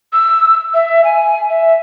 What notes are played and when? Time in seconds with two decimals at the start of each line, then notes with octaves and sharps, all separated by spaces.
0.13 E6
0.74 E5
1.04 G#5
1.50 E5